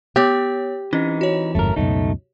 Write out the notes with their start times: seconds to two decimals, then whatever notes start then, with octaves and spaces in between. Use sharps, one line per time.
0.16 B3 G4 C#5
0.93 E3 C4 C#4 D#4
1.21 F#4 C#5
1.55 G1 F2 G#2 A3 A#4
1.76 C#2 F#2 B2 A3 D#4